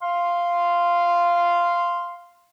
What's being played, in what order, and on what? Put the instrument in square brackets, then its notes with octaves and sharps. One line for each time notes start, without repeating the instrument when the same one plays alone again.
[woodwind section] F5 C6